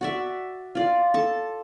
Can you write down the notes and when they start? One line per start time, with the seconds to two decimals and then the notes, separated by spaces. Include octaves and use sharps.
0.01 F#4 D5 E5
0.75 F4 D5
1.14 A4 A5